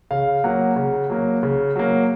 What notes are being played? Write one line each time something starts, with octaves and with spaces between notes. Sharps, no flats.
C#3 F5
F#3 A#3 F#5
C#3
F#3 A#3
C#3
F#3 A#3